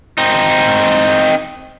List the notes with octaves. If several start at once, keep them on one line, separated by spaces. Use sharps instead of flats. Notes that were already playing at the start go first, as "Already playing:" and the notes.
C4 D#4